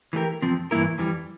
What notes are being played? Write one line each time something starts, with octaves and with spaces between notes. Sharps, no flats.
E3 A3 D4 G4 A#4
F2 C3 F3 C4
G2 E3 A#3 E4 A#4
F2 E3 G3